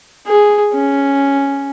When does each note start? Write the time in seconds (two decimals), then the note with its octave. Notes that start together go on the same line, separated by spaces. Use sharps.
0.27 G#4
0.74 C#4